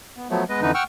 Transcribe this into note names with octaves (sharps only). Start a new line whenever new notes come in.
B3
F3 F#3 A3 B3
G#3 B3 B4 D#5
F2 D3 E3 D#4 B4
F#5 G5 C#6 E6 F6